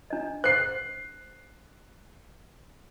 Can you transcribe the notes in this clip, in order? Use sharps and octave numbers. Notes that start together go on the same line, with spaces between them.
D4 D#5
C5 F#6 C7